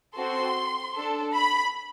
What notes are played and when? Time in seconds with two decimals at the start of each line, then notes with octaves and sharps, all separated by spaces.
0.16 C4 F#4 A4 C6
0.96 D4 A4
1.34 B5